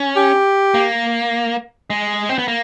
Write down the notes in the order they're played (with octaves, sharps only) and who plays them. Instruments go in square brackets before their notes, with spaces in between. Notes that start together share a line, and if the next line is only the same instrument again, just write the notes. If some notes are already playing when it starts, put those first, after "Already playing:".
Already playing: [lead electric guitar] C#4
[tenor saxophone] G4
[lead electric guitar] A#3
G#3
C4
B3
A#3